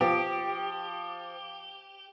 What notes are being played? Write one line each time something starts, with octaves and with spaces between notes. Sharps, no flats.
F3 G4